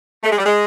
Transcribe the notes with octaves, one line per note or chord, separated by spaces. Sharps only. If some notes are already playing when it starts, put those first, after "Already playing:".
A3
G#3
G3
G#3